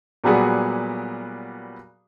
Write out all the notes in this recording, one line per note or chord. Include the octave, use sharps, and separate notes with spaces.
A#2 F#3 G3 B3 F#4 G#4